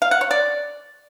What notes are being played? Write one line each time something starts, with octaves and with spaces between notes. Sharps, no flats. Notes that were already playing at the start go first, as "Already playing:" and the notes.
F5
F#5
C#5
D5